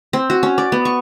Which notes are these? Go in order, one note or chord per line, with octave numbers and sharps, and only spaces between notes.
C4
F#4
C#4
D5
B3
C#6